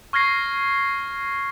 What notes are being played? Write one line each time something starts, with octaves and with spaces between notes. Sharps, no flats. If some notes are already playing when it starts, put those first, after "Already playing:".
C#6 F6 G#6 A#6 C7